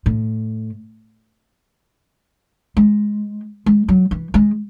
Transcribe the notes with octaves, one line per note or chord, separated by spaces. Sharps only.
A2
G#3
G#3
F#3
E3
G#3